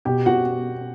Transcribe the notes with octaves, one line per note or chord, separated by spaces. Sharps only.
B2 G4 G5
B2 F#4 F#5